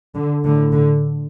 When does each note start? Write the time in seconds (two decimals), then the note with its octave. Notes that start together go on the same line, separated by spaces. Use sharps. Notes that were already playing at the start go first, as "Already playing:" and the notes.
0.15 D3
0.44 A2 D3
0.72 D3